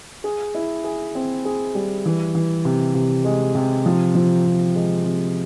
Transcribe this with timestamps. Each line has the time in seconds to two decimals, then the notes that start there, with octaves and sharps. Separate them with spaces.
0.24 G#4
0.55 E4
0.84 G#4
1.15 C4
1.45 G#4
1.75 G3
2.05 E3
2.35 E3
2.65 C3
2.95 C3
3.25 G#3
3.55 C3
3.86 F3
4.15 F3
4.46 C3
4.76 G#3
5.05 C3